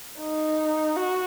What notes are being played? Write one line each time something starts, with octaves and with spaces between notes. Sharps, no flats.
D#4
F#4